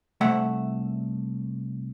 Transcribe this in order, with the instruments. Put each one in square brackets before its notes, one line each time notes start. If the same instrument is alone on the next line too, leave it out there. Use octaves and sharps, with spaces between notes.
[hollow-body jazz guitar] C2 A3 E5 F#5